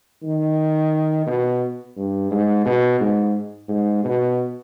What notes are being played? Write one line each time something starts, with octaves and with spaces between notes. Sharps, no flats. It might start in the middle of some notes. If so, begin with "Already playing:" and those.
D#3
B2
G2
G#2
B2
G#2
G#2
B2